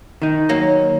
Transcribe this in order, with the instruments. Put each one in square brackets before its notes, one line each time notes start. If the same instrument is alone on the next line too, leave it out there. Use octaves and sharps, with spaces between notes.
[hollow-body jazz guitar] D#3 D#4
[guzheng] F#3 A#3